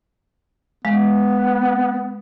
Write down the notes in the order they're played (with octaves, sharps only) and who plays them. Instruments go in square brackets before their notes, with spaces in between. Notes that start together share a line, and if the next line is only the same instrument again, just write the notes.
[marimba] G#3 F5 [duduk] B3